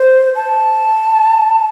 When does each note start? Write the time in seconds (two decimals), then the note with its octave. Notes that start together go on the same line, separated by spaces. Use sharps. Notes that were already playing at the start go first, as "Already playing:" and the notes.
Already playing: C5
0.35 A5